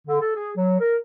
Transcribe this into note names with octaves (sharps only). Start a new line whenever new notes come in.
D3
A4
G#4
F#3
A#4